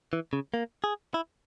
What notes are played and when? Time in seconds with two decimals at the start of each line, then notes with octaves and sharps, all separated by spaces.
0.13 E3
0.33 C#3
0.54 A#3
0.84 G#4
1.14 E4